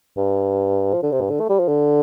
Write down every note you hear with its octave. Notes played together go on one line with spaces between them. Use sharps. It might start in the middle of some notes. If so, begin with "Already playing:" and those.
G2
F3
D3
C3
G2
D3
A3
G3
F3
D3